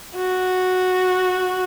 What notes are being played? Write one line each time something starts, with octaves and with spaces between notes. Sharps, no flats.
F#4